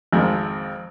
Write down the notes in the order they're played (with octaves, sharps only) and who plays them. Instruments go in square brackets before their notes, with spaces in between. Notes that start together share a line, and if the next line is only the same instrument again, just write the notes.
[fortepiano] G#1 F2 G#3